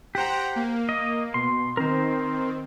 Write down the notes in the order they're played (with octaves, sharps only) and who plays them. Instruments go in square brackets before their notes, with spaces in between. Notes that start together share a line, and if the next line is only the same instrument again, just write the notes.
[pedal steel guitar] G4 C5 [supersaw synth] F#5 G5 A#5
[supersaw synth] A#3
[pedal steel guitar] D#5
[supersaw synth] B2 [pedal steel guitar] C6
[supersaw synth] D#3 C4 [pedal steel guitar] A#4 C5